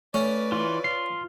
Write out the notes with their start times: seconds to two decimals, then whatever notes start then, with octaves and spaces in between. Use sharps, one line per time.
0.14 A3 C#4 B4 D5
0.52 E3 F4
0.84 F4 C7